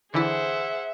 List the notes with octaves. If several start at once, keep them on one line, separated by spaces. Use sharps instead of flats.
D3 E3 E4 G#4 C5 E5 F#5